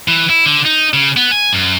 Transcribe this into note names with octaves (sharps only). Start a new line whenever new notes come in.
E3
E4
D3
D#4
C#3
B3
G#5
F#2